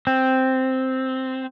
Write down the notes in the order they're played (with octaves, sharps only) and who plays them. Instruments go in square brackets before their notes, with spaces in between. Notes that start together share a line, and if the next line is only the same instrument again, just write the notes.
[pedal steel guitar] C4